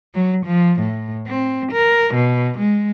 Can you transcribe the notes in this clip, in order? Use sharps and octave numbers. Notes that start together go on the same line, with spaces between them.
F#3
F3
A2
C4
A#4
B2
G#3